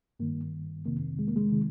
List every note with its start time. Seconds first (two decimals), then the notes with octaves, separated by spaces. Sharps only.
0.20 G2 D#3 A#3
0.86 F2 C3 D#3 A#3
1.19 G#3
1.28 A#3
1.36 G#3
1.52 C3 D#3